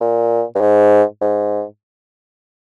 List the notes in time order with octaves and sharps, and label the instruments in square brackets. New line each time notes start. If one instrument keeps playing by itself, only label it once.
[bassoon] A#2
G2
G#2
G#2